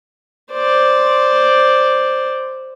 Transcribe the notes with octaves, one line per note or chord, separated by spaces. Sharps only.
C5 D5